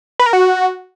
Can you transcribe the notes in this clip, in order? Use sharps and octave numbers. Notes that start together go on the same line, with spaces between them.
B4
A#4
F#4